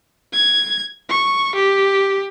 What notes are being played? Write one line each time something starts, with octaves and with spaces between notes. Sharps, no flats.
G#6
C#6
G4